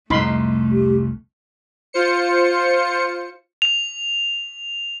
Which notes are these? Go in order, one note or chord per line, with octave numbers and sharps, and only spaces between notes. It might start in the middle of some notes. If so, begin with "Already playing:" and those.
C2 F2 A3 D#4 B5 C6
G4
F4 C5 C#7
F7